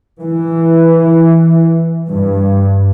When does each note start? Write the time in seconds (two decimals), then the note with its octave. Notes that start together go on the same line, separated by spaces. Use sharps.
0.22 E3
2.10 G2